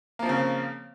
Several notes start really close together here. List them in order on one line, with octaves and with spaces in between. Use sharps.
A#3 F3 C4 C#3